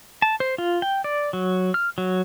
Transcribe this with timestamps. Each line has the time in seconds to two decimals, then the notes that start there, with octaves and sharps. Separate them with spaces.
0.22 A5
0.40 C5
0.58 F4
0.82 G5
1.04 D5
1.33 F#3
1.74 F6
1.98 F#3